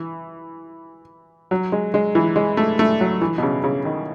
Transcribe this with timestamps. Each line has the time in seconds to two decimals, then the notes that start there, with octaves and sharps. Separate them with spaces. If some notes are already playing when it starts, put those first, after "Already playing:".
Already playing: E3
1.51 F#3
1.72 G#3
1.94 G#3
2.15 E3
2.36 G#3
2.57 A3
2.79 A3
3.01 F#3
3.21 E3
3.38 B2
3.43 C#3
3.64 C#3
3.85 D#3